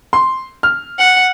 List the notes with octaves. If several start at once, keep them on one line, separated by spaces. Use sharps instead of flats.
C6
F6
F#5